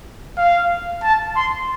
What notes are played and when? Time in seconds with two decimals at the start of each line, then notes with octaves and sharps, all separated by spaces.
0.37 F5
1.03 A5
1.36 C6